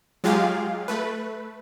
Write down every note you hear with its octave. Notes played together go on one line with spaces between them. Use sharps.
F#3 G#3 F4 G4 G#4 F5
A3 B4